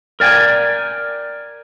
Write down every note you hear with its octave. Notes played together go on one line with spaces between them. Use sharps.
A#4 D5 G5 G#5